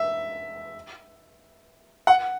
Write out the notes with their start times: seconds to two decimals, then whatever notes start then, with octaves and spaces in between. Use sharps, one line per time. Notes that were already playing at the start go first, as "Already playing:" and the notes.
Already playing: E5
2.07 F#5